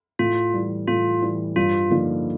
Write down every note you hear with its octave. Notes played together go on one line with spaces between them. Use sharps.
A2 F4
E3 G3
A2 F4
E3 G3
G2 F4
D3 F3 A#3 D#4